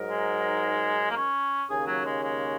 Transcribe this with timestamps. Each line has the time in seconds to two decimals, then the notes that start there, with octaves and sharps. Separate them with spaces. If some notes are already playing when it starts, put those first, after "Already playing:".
Already playing: G#2 F#3 D#4 A#4
0.10 G#3
1.10 A#3
1.16 C#4
1.70 D#2 C#3 A#3 C#4 G#4
1.87 F#3
2.05 G#3
2.23 G#3